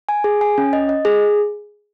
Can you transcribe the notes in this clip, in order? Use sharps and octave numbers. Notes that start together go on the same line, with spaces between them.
G#5
G#4
G#5
C#4
D#5
D#5
G#4